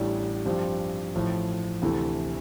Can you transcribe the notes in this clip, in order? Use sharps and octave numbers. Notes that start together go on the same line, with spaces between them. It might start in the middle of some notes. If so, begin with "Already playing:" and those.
Already playing: A1 A2 G3 D4
G2 F3 C4 G4
A1 A2 F3
D2 C3 E3 A3